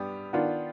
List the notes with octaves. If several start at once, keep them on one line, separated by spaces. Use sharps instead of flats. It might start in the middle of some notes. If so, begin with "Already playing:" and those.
Already playing: G2 G3 B3 G4
D#3 B3 D4 F4